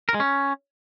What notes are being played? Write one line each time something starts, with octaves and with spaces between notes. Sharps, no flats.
A#4
G#3
C#4